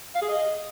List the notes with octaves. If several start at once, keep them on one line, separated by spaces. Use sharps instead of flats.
F5
G#4
D#5